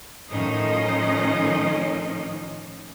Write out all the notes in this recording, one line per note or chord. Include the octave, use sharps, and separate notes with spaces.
A2 D#3 F3 C#4 D#4 D#5